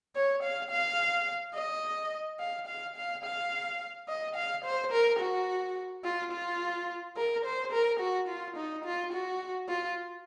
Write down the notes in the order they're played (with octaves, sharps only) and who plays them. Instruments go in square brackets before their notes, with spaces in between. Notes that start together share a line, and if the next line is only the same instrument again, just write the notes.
[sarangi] C#5
F5
F5
D#5
F5
F5
F5
F5
D#5
F5
C5
A#4
F#4
F4
F4
A#4
C5
A#4
F#4
F4
D#4
F4
F#4
F4